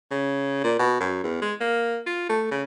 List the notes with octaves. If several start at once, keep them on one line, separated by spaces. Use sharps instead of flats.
C#3
A#2
B2
F#2
E2
G#3
A#3
F4
A3
C#3